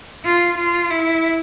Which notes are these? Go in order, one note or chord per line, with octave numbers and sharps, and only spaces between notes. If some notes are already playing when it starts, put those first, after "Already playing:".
F4
F4
E4